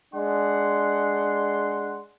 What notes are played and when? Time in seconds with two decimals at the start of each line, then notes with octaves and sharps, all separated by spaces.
0.15 G#3 D4 F#5 C6